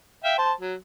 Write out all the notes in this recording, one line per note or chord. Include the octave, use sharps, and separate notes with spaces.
E5 F5 G5
C5 A5
F#3